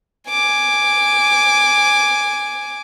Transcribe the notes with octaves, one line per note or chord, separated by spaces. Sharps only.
G#5 D6